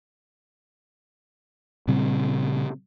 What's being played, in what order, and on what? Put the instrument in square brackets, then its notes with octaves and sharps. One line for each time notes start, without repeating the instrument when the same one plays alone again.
[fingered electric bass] A#2 C#3 G3 C4